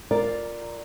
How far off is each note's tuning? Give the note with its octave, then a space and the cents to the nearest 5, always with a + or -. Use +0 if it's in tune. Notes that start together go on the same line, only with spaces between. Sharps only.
F4 +0 A#4 +0 D5 +0